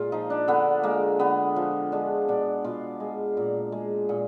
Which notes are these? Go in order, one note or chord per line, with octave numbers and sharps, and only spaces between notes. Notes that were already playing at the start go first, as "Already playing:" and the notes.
Already playing: A#2 G#3 F4
F3 D#4
D4
D3 B3
G#3 A#3
D3 B3
F3
G#3 D4
B2 D4
B2 F4
G#3
A#2
G#3
A#2 G#4